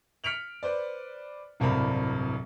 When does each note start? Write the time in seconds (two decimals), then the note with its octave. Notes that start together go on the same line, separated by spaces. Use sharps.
0.24 F6 B6 C#7 D7 F7 F#7
0.63 B4 C5 D5
1.60 D1 C2 G2 C4 A#4 B5